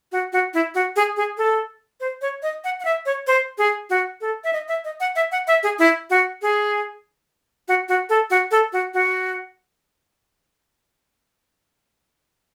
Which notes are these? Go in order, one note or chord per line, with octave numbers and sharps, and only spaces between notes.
F#4
F#4
E4
F#4
G#4
G#4
A4
C5
C#5
D#5
F#5
F#5
E5
C#5
C5
G#4
F#4
A4
E5
D#5
E5
D#5
F#5
E5
F#5
E5
G#4
E4
F#4
G#4
F#4
F#4
A4
F#4
A4
F#4
F#4